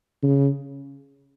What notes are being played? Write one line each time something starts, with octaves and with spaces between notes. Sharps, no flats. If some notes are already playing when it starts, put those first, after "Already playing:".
C#3